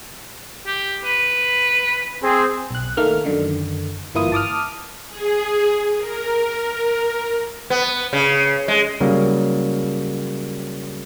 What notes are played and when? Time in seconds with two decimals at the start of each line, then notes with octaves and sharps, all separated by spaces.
0.66 G4
1.04 B4
2.23 C4 G#4
2.71 B1 F#6
2.97 D#3 A3 A#3 F6
3.24 F#2 D3 D#3
4.15 G1 E3 A#3 E4 F4 D#6
4.32 A5 D6 D#6 F6
5.09 G#4
5.98 A#4
7.70 B3
8.13 C#3
8.68 G#3
9.01 C#3 F#3 G3 A#3